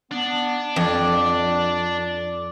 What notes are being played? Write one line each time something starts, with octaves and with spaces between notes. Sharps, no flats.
B3 D4
F2 D5 D6